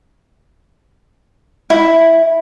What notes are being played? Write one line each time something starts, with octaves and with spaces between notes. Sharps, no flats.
E4